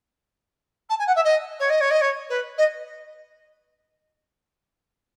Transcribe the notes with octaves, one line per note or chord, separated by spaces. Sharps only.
A5
G#5
F#5
E5
D#5
C#5
D#5
C#5
D#5
C#5
B4
D#5